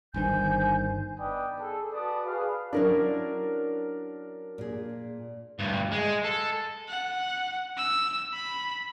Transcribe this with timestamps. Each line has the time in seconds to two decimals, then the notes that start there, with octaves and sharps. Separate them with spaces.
0.14 G1 G2 D#3 C5 G#5 G6
1.19 B3 D#4 B4 D5 G5 D#6
1.59 G#4 A4
1.93 F#4 B4 D5 A5 D6 D#6
2.26 G#4 B4 F5
2.73 F#3 C#4 D4 E4 A#4
4.58 A#2 G#4
5.60 D2 G2
5.92 G#3
6.24 A4
6.88 F#5
7.77 E6
8.33 B5